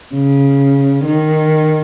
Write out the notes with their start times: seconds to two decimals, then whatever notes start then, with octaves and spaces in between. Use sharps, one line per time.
0.14 C#3
1.05 D#3